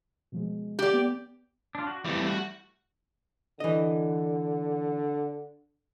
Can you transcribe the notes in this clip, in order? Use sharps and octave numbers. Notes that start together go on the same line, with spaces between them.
B2 F3 G#3
G4 D5
B3
D4 F4
F#4
F2 E3 G3 A3 G4
F#4
D3 E3 D#5